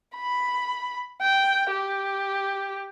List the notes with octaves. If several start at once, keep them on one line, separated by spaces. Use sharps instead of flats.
B5
G5
G4